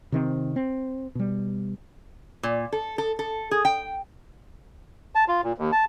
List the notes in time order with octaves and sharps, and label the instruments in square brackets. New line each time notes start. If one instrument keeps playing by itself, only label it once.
[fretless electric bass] C3 D#3 C4
C4
B2 G3
[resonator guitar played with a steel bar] A#2
A4
A4
A4
G#4
G5
[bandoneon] A5
F4
A#2
D#2
A5